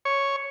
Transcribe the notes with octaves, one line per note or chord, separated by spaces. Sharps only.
C#5